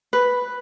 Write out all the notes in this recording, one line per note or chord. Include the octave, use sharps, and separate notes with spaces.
B4